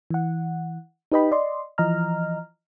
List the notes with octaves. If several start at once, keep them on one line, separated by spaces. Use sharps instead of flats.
E3 F#5
D#4 G4 B4 D#5 G5 B5
D5 D#5 C6
E3 F3 D#5 A#5 F6